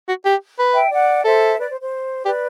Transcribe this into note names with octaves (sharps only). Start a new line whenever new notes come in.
F#4
G4
B4
E5 G5
D5 F#5
A4 C5 E5
B4 D5
C5
C5
G4 B4 D5